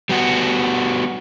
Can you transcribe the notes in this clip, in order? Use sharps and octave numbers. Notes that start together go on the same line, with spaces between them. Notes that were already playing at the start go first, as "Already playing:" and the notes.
G3 B3 F#4